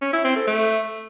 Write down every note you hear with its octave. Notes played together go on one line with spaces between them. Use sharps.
C#4
E4
C4
A4
A3